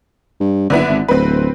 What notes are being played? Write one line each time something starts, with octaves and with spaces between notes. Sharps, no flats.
G2
F#1 D3 B3 E4
G#1
D1 C4 B4